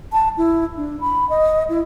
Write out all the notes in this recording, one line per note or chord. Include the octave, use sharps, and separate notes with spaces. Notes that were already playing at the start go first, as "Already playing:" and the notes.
A5
E4
D4
B5
D#5
E4